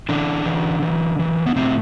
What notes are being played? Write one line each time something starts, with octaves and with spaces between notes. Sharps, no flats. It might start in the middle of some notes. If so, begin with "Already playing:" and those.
D3 E3 D4
E3
E3
E3
B3
A2 C3 C4